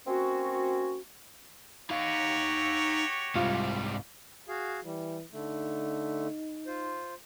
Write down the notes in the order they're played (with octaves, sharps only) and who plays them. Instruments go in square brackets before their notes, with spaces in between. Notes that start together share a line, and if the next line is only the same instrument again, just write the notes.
[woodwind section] A#3 C4 C#4 F#4
[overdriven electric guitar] D#4 F5 [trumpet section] F#4 G4 C#5
[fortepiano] C2 F4 F5 [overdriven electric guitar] G#2 G3
[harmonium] F#4 G#4 F5
[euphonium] E3 [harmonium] G3
[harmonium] D3 A3 [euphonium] D#4
[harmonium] F4 C5